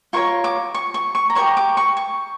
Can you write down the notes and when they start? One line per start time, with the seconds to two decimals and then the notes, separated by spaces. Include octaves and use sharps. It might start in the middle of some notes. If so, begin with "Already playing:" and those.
0.13 F4 A#4 C#5 C#6
0.44 D6
0.75 C#6
0.94 C#6
1.15 C#6
1.30 A#5
1.35 G4 A#4 C#5 C#6
1.57 D6
1.77 C#6
1.97 C#6